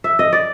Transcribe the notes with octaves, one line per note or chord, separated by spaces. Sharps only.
E5
D#5
D5